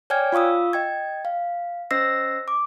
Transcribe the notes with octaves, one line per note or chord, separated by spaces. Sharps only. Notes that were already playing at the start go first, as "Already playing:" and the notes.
C#5 D5 G5 G#5 F6 G#6
F4 F5 C#6 D#6 E6
D#5 G5 G#6
F5
C#4 C5 D#5 E6 A#6 C7
D6